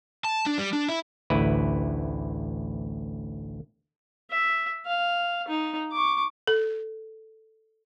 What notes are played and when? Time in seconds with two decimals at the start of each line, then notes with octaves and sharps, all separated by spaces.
0.24 A5
0.46 D4
0.58 G3
0.73 D4
0.88 E4
1.30 A1 D2 E4 B4
4.31 E5
4.86 F5
5.48 D#4
5.92 C#6 D6
6.47 A4